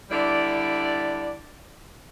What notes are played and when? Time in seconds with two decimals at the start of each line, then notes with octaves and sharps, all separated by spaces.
0.10 D3 G3 E4 D5